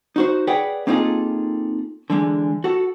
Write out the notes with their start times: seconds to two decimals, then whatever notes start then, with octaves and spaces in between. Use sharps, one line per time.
0.16 D#4 F#4 C5
0.47 G#4 B4 C#5 D5 F#5 G5
0.87 A#3 C4 D#4 F4 G#4 A4
2.10 D3 E3 G#3
2.64 F#4 A4